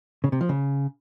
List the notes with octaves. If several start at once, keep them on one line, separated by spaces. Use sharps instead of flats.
C#3
C3
F3
C#3